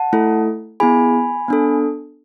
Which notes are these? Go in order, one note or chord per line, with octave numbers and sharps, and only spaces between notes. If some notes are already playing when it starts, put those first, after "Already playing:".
Already playing: F#5 A5
A3 E4 A4
B3 E4 G#4 G#5 B5
B3 D4 A4